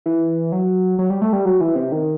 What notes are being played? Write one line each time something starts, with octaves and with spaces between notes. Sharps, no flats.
E3
F#3
F#3
G3
A3
G3
F#3
E3
C3
D#3